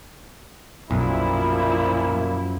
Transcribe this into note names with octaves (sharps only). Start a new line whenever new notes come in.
B1 F#2 A#2 F3 E4